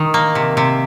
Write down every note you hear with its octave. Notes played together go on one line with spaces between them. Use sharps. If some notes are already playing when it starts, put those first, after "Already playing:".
Already playing: D#3
A#3
C3
C3